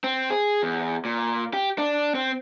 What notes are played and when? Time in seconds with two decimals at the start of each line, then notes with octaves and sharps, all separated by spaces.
0.04 C4
0.30 G#4
0.63 E2
1.05 A#2
1.53 G4
1.78 D4
2.15 C4